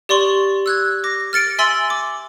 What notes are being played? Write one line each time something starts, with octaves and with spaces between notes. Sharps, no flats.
G4 D5 C6 C#6 F#7
E6 F#6 G#6
D6 A#6
F6 A6 C#7 D7
E5 G#5 C6 E6 A6 F#7
D6